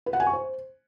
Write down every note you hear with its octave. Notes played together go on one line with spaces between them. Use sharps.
B4
F#5
G#5
C#6
C5